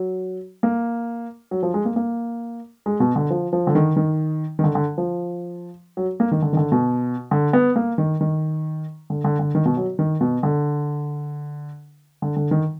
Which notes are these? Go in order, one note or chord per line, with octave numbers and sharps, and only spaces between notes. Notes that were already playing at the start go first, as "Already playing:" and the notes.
Already playing: F#3
A#3
F#3
F3
G#3
A#3
A#3
G#3
B2
D3
F3
F3
D3
D#3
D#3
D#3
D3
D3
F3
F#3
A#3
D#3
D3
D#3
D3
B2
D3
B3
A#3
D#3
D#3
D3
D3
D3
D#3
B2
F#3
D#3
B2
D3
D3
D3
D#3